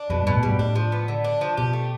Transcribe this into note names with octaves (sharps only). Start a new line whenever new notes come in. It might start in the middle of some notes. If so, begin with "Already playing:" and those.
Already playing: D4
F2 B2
G2
B2
A2
G2 G3
A2 D4
F3
B3
D3
D4
F3
B2 G4
A3